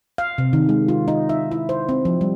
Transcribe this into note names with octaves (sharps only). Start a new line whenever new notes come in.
F5
C3
D#3
G#3
F4
D#4
E5
E4
C5
C4
F3
G3